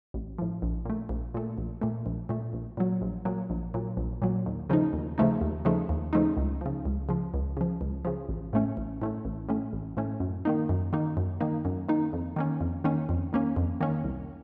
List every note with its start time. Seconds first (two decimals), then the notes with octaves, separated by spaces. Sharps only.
0.14 A1
0.38 A2 F3
0.62 A#1
0.85 A#2 A3
1.09 A#1
1.34 A#2 A3
1.58 A#1
1.82 A#2 A3
2.06 A#1
2.29 A#2 A3
2.53 A#1
2.77 A#2 F#3
3.01 A#1
3.25 A#2 F#3
3.50 A#1
3.74 A#2 F#3
3.97 A#1
4.22 A#2 F#3
4.46 D#2
4.70 C#3 F3 A3 D#4
4.93 D#2
5.18 C#3 F3 A3 D#4
5.41 D#2
5.65 C#3 F3 A3 D#4
5.89 D#2
6.13 C#3 F3 A3 D#4
6.37 C#2
6.61 C#3 F3
6.86 C#2
7.09 C#3 F3
7.34 C#2
7.57 C#3 F3
7.81 C#2
8.05 C#3 F3
8.29 A1
8.53 A2 A3 C#4
8.77 A1
9.02 A2 A3 C#4
9.25 A1
9.49 A2 A3 C#4
9.73 A1
9.97 A2 A3 C#4
10.20 F#2
10.45 D#3 A#3 D#4
10.69 F#2
10.93 D#3 A#3 D#4
11.17 F#2
11.41 D#3 A#3 D#4
11.65 F#2
11.89 D#3 A#3 D#4
12.13 F2
12.36 D#3 A#3 C#4
12.61 F2
12.84 D#3 A#3 C#4
13.09 F2
13.33 D#3 A#3 C#4
13.56 F2
13.81 D#3 A#3 C#4
14.04 C2